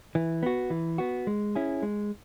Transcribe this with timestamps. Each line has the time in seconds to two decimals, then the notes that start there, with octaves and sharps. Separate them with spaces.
0.15 E3
0.43 B3 F#4
0.70 E3
0.98 B3 F#4
1.27 G#3
1.55 C#4 E4 G#4
1.82 G#3